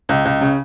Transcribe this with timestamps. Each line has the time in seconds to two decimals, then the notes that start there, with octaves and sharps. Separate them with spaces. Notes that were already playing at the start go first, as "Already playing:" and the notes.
0.09 C#2
0.25 C#2
0.41 C#3